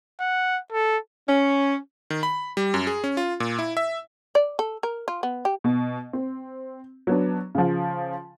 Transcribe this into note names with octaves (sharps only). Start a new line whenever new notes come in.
F#5
A4
C#4
D#3
B5
G3
F#2
G#4
C#4
F4
A#2
E4
E5
D5
A4
A#4
F4
B3
G4
B2
C4
F#3 B3 D4
C#3 F3